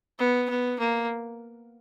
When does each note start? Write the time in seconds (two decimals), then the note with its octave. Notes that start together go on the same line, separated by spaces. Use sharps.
0.19 B3
0.50 B3
0.79 A#3